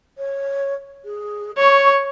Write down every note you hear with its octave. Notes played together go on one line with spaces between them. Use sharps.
C#5
G#4
C#5 C#6